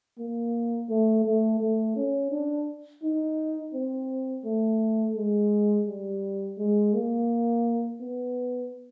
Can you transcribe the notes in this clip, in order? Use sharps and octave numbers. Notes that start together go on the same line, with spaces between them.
A#3
A3
A3
A3
C#4
D4
D#4
C4
A3
G#3
G3
G#3
A#3
B3